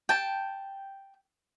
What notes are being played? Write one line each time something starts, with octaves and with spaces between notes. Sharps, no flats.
G5 A5